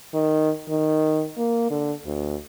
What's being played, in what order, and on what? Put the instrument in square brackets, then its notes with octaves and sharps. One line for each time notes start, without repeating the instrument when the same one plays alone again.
[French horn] D#3
D#3
A#3
D3
D2